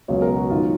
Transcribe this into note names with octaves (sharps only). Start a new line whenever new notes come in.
C#2 B2 F#3 C#5
A#4
F#4
G#2 D#3 F#3 F4